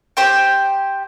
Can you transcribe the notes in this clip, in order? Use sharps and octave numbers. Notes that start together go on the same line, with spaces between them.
G4 C5 G5